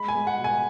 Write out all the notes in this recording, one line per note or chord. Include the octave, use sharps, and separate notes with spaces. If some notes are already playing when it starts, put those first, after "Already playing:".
Already playing: G#3 B5
G#5
G#3
F#5
B2
G#5